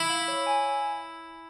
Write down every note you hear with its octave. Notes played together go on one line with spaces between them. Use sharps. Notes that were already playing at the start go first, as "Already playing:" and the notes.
Already playing: E4
F5
C#5
G#5